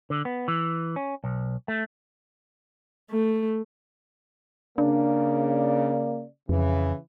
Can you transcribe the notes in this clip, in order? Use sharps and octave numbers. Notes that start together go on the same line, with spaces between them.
D3
B3
E3
C#4
B1
A3
A3
C#3 A#3 D4 D5
F2 C#3 E3